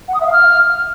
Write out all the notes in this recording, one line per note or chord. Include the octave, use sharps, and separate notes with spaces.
F#5
D#6
E5
F5
F6